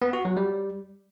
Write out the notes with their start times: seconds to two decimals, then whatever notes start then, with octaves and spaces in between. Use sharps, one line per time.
0.02 B3
0.13 F#4
0.25 F#3
0.37 G3